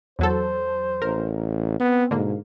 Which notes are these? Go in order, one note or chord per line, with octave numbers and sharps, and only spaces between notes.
E2 F#3 A4 C5
A1 A#4
B3 C4
G#2 B2 D3 A#3